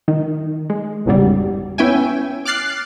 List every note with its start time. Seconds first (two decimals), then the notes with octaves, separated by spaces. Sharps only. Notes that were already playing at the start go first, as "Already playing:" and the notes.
0.08 D#3
0.70 G#3
1.06 G1 E2 G#2 C#3 F#3 G3
1.78 B3 C#4 E4 E5 G5 G#5
2.45 D6 F6 F#6 A6 C7